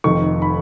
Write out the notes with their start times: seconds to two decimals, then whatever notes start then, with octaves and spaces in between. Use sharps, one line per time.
0.04 F1 F2 D#3 C#6
0.42 B5